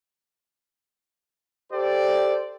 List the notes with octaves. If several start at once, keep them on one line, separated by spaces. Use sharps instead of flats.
G4 A4 C5 D5